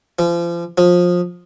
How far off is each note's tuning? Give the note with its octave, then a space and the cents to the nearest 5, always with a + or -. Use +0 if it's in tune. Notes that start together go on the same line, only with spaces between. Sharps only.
F3 -35
F3 +20